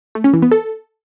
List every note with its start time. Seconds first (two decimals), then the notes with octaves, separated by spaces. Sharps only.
0.15 A3
0.24 C#4
0.33 E3
0.42 B3
0.51 A4